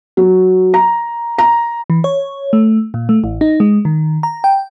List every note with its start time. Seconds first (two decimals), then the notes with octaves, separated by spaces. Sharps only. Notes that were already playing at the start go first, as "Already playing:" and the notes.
0.17 F#3
0.74 A#5
1.38 A#5
1.90 E3
2.04 C#5
2.53 A3
2.94 A#2
3.09 A3
3.24 A1
3.41 D#4
3.60 G#3
3.85 D#3
4.23 A#5
4.44 G5